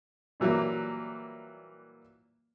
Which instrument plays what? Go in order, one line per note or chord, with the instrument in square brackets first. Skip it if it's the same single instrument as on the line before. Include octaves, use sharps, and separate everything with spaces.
[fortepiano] A#2 E3 F#3 G3 A#3